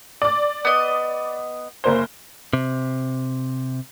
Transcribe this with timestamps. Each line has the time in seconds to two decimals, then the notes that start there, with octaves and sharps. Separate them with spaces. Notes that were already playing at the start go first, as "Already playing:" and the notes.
0.22 D5 D6
0.65 B3 D#5
1.84 F#1 A#3 C5
2.53 C3